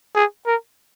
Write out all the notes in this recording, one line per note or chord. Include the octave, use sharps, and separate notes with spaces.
G#4
A#4